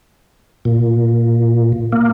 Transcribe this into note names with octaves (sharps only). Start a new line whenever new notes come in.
A#2
A#3